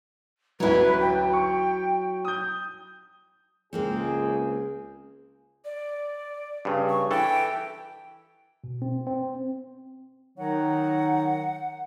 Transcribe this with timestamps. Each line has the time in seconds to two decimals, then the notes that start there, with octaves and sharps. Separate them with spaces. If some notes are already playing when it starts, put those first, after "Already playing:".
0.60 A1 D2 F#3 E4 B4
1.01 G5
1.33 C#6
2.25 D#6 G6
3.73 C#2 G#3 A#3 C4 G#4
5.65 D5
6.65 G2 C#3
6.89 C#6
7.11 E3 A4 G5
8.64 B2
8.82 C4
9.06 C4
10.38 D#3 F#3 D#4 F#5